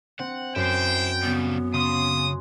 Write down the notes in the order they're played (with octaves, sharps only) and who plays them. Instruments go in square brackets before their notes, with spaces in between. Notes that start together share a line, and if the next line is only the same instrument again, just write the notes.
[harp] C4 [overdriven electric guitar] F#5
[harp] F#2 [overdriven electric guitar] E4 C5 [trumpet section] G5
[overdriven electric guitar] C#3 G3 [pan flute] B3
[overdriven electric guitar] C#3 [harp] C6 [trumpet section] D#6